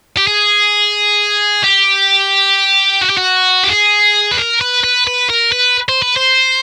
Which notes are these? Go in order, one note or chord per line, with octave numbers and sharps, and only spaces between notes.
G4
G#4
G4
F#4
G4
F#4
G4
G#4
B4
A#4
B4
B4
B4
A#4
B4
C5
B4
C5